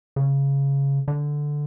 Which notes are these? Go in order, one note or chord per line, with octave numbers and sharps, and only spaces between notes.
C#3
D3